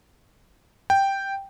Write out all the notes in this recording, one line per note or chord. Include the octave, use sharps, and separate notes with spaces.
G5